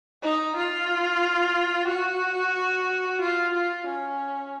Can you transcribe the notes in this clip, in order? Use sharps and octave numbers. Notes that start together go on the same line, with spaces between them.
D#4
F4
F#4
F4
F4
C#4